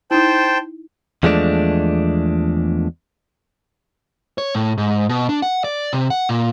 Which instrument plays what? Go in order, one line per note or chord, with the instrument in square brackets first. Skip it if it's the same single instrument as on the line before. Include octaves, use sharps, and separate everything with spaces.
[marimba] D#4 E4 [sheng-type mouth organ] C5 G5 A5
[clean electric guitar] E2 F3 G#3 A3 D4
[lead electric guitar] C#5
A2
G#2
B2
D4
F#5
D5
C3
F#5
A#2